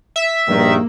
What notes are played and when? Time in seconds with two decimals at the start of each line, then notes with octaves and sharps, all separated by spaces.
0.16 E5
0.48 A#1 G2 D#3 A#3